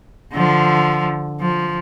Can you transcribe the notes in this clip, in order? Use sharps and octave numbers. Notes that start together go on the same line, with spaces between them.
D3 F3
F3